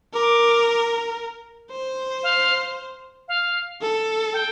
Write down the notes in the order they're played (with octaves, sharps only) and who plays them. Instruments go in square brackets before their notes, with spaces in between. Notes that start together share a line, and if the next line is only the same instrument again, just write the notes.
[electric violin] A#4 [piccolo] D6
[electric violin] C5
[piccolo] F5
F5
[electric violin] A4
[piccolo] G5